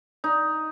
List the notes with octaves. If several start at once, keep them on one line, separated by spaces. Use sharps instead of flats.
D#4